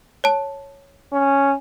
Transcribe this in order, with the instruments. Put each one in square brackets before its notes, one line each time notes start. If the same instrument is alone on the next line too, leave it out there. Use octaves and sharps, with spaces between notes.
[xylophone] C#5 A5
[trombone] C#4